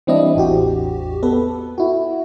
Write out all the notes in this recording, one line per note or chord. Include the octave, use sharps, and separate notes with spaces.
E3 G3 C4 D4 E4 D#5
A1 E2 F#4 G4
B3 A4 B4
E4 F#4